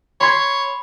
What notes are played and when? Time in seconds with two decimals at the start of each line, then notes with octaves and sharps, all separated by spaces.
0.21 C#5 B5 C6 G#6